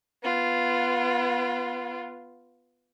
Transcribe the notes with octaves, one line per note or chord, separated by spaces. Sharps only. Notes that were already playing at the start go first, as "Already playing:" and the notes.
B3 F4